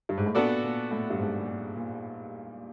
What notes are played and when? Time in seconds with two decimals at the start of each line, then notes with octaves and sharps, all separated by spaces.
0.09 G2
0.18 G#2
0.26 A2
0.35 A#2 B3 D4 F#4 A4 D5
0.63 A#2
0.91 A2
1.10 G2
1.19 G#2
1.40 A#2
1.48 A2
1.76 A#2